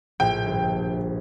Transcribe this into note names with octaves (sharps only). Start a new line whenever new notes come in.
A#1 A2 G5
G1